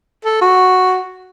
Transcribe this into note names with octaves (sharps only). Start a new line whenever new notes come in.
A4
F#4